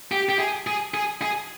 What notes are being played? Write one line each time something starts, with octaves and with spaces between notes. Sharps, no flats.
G4
G4
G#4
G#4
G#4
G#4